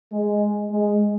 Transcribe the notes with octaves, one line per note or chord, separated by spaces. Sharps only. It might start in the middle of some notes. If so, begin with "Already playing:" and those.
G#3
G#3